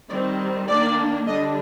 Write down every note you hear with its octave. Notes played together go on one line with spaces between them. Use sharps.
D#3 G3 C4 D5
D#3 A#3 D4 D5
D3 G3 D4 D#5